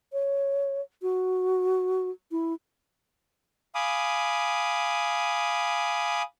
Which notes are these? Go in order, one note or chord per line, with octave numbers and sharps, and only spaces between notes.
C#5
F#4
E4
F5 G#5 B5 D6 D#6